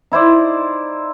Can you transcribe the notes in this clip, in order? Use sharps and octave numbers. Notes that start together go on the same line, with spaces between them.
D#4 E4 C5 D5